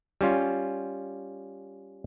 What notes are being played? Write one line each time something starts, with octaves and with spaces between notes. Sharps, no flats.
G3 C#4 F4